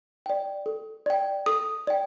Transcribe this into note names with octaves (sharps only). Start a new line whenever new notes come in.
D5 G5
A4
D5 G5
A4 D#6
D5 G5